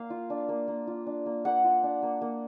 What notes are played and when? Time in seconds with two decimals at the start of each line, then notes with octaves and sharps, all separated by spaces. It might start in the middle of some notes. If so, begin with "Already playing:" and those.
Already playing: A#3 F5
0.10 F4
0.30 D4
0.49 A#3
0.68 A#3
0.87 F4
1.07 D4
1.26 A#3
1.45 A#3 F#5
1.64 F4
1.83 D4
2.03 A#3
2.21 A#3